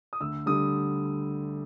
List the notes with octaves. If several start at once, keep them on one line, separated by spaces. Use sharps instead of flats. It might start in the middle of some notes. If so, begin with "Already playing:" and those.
D#6
D2 E6
D3 G3 D#6